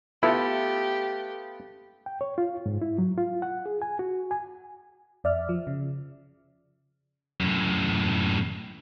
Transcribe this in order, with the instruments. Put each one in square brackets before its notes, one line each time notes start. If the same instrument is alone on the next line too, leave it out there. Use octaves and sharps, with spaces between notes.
[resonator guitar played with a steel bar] A3 [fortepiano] B3 F4 A4 [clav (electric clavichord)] E4 [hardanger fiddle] G4
[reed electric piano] G5
C#5
F4
G#2
E4
F#3
F4
F#5
G#4
G#5
F#4
G#5
[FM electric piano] F2 D5 E5 F6
F3
C#3
[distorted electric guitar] F#2 A2